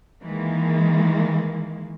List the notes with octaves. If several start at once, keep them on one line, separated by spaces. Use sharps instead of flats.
D#3 E3 G#3 A#3